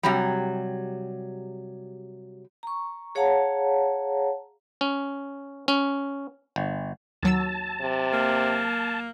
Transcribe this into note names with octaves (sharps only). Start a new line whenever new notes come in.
C3 F#3 G3
A#5 C#6
G#4 C#5 F5 F#5 A5 A#5
C#4
C#4
G1
D#2 F#3 A5 E6
C3
A#3